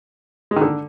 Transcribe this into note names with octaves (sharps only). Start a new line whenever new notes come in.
G#3
D#3
D3